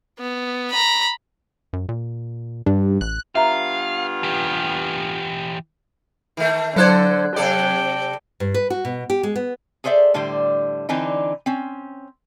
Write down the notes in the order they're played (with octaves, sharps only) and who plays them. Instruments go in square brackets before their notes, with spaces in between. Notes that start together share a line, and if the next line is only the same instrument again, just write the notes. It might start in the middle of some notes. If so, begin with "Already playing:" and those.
[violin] B3
A#5 B5
[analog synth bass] F#2
A#2
[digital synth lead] G2 [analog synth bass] D4
[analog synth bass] A1 [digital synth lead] F#6
[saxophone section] G2 B3 F4 [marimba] E5 A#5 [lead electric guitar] F5
[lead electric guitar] E3 G4
[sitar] D#3 A3
[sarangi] D3 [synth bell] F#3 F#6 G#6 [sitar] A4 C5 D5
[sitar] C3 A4 D5 [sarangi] G5
[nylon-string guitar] G2
B4
F#4
B2
G4
G#3
B3
[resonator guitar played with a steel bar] G#4 A4 C5 D5 E5
A2 D3 G3 D4 C5
D3 E3 C4 D4 D#4
C4 C#4